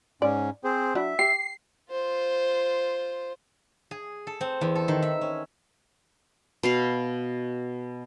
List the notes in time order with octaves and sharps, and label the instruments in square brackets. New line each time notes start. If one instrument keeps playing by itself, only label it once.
[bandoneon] G#2 C#4 [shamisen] D5
[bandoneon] C4 G#4 C5
[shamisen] F#3 D4 E4 [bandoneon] E5
[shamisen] G4 [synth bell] C7
[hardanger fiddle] F4 C5
[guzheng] G#4
A4
C4
E2
A4
D#3
E5
C#4
[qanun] B2 F5 B5